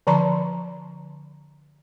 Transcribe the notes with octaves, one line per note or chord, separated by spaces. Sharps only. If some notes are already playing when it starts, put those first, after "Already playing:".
D3 F3 A5 A#5 C6